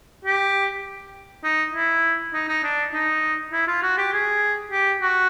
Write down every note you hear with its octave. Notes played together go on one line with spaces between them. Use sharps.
G4
D#4
E4
D#4
D#4
D4
D#4
E4
F4
F#4
G4
G#4
G4
F#4